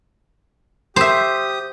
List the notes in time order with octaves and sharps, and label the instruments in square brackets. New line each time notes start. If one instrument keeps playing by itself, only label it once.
[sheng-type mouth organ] G4 D#6 [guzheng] C5 E5